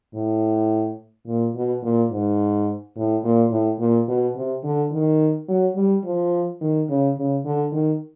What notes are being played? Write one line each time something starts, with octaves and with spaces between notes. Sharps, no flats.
A2
A#2
B2
A#2
G#2
A2
A#2
A2
A#2
B2
C3
D3
D#3
F#3
G3
F3
D#3
C#3
C#3
D3
D#3